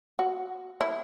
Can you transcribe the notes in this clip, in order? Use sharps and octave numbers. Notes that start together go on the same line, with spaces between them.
F#4
E4